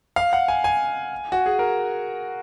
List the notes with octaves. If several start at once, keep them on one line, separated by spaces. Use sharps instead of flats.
F5
F#5
G#5
G#5
F#4
G#4
A#4